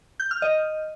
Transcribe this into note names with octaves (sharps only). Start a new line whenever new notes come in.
G6
F6
D#5